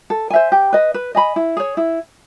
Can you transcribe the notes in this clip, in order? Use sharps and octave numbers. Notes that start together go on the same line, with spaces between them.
A4
C5 E5 G#5
G4
B4 D#5
B4
D#5 G#5 B5
E4
G#4 C#5
E4